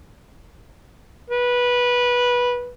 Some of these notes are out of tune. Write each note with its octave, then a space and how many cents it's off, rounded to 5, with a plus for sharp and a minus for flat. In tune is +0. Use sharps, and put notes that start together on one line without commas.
B4 -15